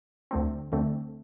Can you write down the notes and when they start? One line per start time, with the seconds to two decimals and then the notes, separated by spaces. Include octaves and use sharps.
0.31 D2 D3 A3 C4
0.72 D2 D3 A3 C4